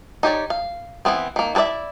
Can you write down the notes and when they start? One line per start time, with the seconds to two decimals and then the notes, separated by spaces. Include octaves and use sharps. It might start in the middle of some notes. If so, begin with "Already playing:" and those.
0.23 D#4 G4 C#5 D5
0.50 F5
1.05 E3 F3 B3 C4
1.36 D#3 A#3
1.55 E4 A4 B4 D5 E5